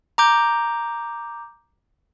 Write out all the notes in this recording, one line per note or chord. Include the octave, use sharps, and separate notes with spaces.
A#5 D6 G6